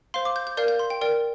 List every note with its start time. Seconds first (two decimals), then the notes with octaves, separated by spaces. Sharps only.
0.14 C5 F5 C6
0.25 D6
0.36 G6
0.47 G6
0.57 A#4 D5 F5 G6
0.68 G6
0.79 C6
0.90 G5
1.01 A#4 D5 G5